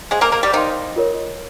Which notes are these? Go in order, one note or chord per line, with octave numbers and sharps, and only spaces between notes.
G#3 G#4 C5 F5 C6
A#3 A#4
A#3 A#4
G3 G4
D#3 D#4 C5 F5 C6
F4 A#4 C#5